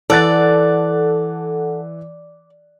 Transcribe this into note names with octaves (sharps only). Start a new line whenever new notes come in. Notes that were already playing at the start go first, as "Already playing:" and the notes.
E3 A4 D5 F#5 F#6 A6